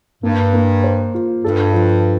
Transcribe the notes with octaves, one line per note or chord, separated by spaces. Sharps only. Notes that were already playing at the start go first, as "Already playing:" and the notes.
G2 A#3
A#3
C5
F4
G2 A4
F3